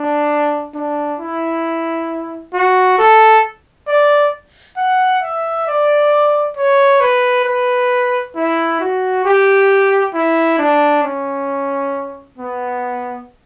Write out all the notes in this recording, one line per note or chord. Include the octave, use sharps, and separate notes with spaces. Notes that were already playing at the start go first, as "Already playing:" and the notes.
Already playing: D4
D4
E4
F#4
A4
D5
F#5
E5
D5
C#5
B4
B4
E4
F#4
G4
E4
D4
C#4
B3